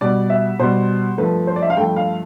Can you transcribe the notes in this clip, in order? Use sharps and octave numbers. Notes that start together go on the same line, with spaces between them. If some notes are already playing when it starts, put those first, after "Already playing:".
B2 G3 D5
E5
B2 G3 C5
G2 F3 A3 B4
C5
D5
E5
F5
G2 F3 A3 G5
F5